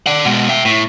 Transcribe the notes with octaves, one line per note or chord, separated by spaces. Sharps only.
D5 F#5
B2 G#3
E5 G5
A2